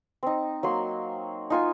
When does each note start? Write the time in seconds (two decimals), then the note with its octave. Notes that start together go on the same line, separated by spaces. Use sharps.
0.23 C4 D#4
0.63 F#3 A#3 C6
1.50 D#4 F4 G#5